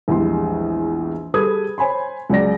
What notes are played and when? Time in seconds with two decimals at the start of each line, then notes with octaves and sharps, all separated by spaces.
0.08 A#1 E2 G3 G#3 C6
1.34 G3 G#4 A4 B4 D#6 G#6
1.78 C5 C#5 G#5 B5 C6
2.30 C#2 F#3 G#4 D5 A#6